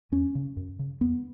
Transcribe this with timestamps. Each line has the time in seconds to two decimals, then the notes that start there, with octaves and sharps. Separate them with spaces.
0.12 E2 C#4
0.35 C#3
0.57 F#2
0.79 C#3
1.01 E2 B3